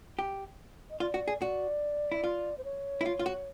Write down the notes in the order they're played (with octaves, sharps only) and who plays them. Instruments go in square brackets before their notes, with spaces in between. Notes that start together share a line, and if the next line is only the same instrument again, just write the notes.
[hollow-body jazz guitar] G4
[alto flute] D#5
[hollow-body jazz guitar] F4 [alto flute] D5
[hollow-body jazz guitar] F#4
G#4
[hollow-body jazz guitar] F#4 [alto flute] D5
[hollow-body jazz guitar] E4
F4
[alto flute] C5
C#5
[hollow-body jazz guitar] E4
F4
F4
F#4